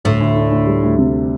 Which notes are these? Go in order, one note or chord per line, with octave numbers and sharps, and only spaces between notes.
D2 A2
D2
D4
D2
G3
D2
C3